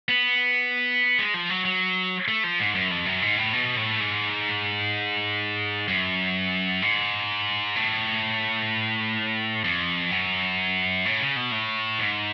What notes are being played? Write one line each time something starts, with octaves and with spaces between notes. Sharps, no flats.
B3
G#3
F3
F#3
F#3
A3
F3
G#2
F#2
F2
F#2
G#2
A2
B2
A2
G#2
F#2
G#2
A2
F2
F#2
A2
C#3
B2
A2
G#2